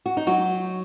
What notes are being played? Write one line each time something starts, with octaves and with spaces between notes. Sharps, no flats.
F#4
D#4
F#3 F#4